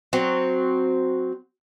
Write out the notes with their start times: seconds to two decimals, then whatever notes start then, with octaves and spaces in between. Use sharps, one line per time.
0.13 F#3 C4